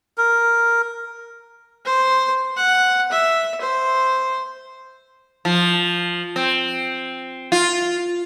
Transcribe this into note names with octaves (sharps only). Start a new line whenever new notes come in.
A#4
C5
F#5
E5
C5
F3
C4
F4